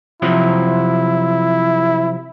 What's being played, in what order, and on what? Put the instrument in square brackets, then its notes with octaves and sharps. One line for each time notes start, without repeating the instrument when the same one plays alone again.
[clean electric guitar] C3 F3 F#3 [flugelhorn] E4